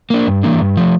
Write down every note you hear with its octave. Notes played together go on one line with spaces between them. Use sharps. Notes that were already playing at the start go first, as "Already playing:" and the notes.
A#3 D4
G2
E3 A#3 D4
G2
F3 A3